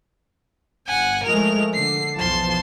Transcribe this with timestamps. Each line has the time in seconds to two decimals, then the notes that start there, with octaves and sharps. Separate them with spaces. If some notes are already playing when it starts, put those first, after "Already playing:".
0.87 G1 F#5 G#5
1.24 F3 G#3 A3 A#4 F7
1.74 D3 C7
2.16 B1 E2 F3 A5 C6